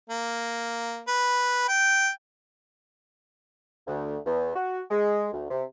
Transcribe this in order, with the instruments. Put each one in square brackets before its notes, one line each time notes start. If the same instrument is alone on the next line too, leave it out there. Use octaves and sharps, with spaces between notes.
[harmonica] A#3
B4
G5
[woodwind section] D2
E2
F#4
G#3
D2
C3